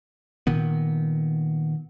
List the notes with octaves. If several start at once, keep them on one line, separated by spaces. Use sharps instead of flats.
A#2 D#3 B3